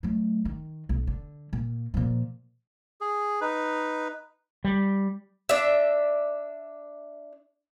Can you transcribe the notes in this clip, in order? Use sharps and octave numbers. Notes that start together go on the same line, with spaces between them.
F#3 A3
D#3
B1
D3
A#2
A#2 F3
G#4
D#4 B4
G3
D4 E5